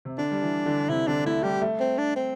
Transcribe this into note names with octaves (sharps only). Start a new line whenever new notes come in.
C3
D3 D4
G3
E3
D3
C3 E4
D3 D4
A3 E4
G3 G4
A3
C4
D4
C4